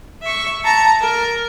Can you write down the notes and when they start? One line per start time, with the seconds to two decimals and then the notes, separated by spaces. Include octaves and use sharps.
0.22 E5 C#6
0.64 A5 A#5
1.01 A#4